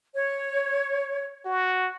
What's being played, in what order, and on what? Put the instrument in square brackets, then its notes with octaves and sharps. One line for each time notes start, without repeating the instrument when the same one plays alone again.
[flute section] C#5
[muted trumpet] F#4